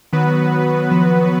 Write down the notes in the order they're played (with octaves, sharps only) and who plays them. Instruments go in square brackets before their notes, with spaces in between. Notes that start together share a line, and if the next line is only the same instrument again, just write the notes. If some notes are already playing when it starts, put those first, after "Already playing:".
[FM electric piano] D#3 [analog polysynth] F#3 B3 F#4 B4
[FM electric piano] F3